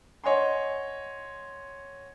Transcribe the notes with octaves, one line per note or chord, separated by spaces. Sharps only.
C#5 D#5 F#5 G#5 C6